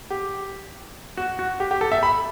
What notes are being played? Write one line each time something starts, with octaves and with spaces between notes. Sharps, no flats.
G4
F#4
F#4
G4
G4
A4
E5
B5